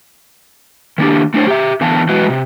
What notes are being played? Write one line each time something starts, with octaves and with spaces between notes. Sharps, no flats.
D#3 A#3 D4 G4
A3 D4 C5 C#5
G4 E5
E2 D3 E3 B3 F5 A5
E3 F#3 G#3 F#4 B4 D#5
C3